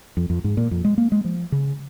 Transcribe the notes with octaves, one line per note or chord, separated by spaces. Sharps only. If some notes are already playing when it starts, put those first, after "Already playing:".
F2
F2
G#2
A#2
F2
G#3
A#3
G#3
F3
C#3